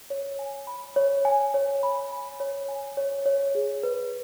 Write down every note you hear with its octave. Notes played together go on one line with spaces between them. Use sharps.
C#5
G#5
B5
C#5
G#5
C#5
B5
B5
C#5
G#5
C#5
C#5
G#4
B4